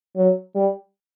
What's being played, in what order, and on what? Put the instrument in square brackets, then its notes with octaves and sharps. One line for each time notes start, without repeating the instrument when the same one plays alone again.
[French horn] F#3
G3